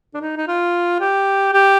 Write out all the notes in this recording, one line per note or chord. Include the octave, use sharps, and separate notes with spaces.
D4
D#4
D#4
F4
G4
G4